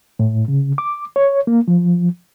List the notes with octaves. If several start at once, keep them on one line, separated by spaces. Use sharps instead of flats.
A2
C#3
D6
C#5
A#3
F3